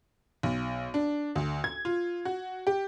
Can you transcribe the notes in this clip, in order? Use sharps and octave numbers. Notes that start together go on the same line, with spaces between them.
B1
D4
D2
G#6
F4
F#4
G4